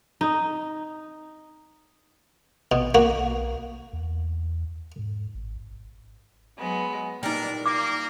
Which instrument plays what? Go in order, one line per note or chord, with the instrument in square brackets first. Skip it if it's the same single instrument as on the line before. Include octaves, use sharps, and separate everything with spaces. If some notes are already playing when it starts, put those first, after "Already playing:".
[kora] D#4
[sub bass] A1 [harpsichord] B2
[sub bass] B1 [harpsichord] A#3 F#4
[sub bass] E2
G#2
G#1
[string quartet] F#3 G#3 B3
[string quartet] A#2 [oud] G3 D#4 [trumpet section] D4 A#4 D5
[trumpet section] A#3 [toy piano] D6